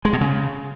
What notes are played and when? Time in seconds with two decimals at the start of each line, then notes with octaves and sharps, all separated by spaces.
0.05 G#3
0.13 B2
0.21 C#3